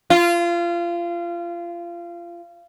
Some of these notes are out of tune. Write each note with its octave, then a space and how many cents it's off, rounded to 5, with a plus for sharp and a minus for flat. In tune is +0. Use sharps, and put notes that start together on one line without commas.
F4 -25